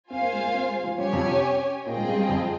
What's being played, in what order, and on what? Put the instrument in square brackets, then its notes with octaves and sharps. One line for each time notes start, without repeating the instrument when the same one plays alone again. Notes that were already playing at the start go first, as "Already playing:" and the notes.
[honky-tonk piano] C4 [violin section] F4 C5 F5 G#5
[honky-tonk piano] A#3
G#3
A#3
C4
G#3
F3
[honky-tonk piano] G2 [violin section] C#4 G4 C#5 G#5
[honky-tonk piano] F2
C3
[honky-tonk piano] A#2 [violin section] C4 F4 G#4 D#5 G5
[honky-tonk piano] G#2
G2
G2
F2